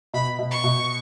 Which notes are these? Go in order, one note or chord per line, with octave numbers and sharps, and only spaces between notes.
B2 B5
B2
C#6
B2